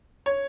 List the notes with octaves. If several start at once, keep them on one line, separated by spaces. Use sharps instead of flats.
C#5